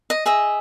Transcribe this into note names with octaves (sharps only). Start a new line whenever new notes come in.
D#5
G#4 D#5 E5